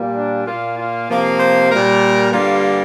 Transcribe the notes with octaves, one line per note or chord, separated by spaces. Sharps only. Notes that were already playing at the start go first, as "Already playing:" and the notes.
Already playing: A#2 G3 A#3
D4
A#2 A#3 F4
F4
C3 F3 A#3
C5
A#2 G3 A#3 A#4
G2 D3 G3 A#3 F4